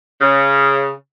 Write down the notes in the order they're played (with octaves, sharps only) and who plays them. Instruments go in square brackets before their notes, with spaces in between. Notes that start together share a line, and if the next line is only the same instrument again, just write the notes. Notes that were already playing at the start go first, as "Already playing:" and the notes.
[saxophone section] C#3